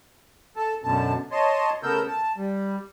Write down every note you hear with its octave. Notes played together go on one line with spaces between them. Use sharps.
A4 A5
F#2 B2 D3 A5
C#5 D#5 A5 C6
C#3 A3 B3 A#4 E6 G6
A5
G3